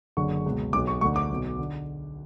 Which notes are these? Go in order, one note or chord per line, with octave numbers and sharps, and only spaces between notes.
F#1 F#2 D3 C#6
C#2 B2
B1 B2 D6
C#6
D2 D3 C#6
D6
B1 B2
D3